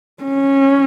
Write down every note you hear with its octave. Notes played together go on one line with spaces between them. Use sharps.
C#4